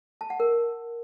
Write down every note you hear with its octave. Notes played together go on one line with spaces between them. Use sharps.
A5
F#5
A#4